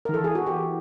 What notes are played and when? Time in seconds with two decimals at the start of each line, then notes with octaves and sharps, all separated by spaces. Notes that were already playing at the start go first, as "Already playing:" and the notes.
0.05 A#4
0.09 D#3
0.14 E3 A4
0.24 G#4
0.35 F#4
0.46 G4